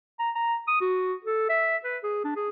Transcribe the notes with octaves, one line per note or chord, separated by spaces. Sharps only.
A#5
A#5
D#6
F#4
A4
E5
B4
G#4
D4
G#4